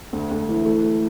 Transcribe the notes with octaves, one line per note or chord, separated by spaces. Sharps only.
D2
D2
E3
A3
A3